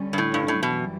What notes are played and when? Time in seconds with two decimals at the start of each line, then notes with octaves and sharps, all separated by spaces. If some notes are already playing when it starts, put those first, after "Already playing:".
Already playing: D3 G3 C#4
0.13 G2
0.18 A2
0.34 G2
0.48 A2
0.63 F#2 B2 E3 G3